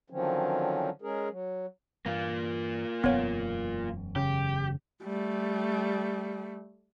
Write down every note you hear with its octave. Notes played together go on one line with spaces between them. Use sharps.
D3 D#3 F3 F#3 C4 C#4
G#3 C#4 G#4 A#4
F#3
G2 E3 A#3 F4
E1 F#2 B3 C#5
C#3 G4
G3 A3